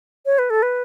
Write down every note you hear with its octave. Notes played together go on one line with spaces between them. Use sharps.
C#5
B4
A4
B4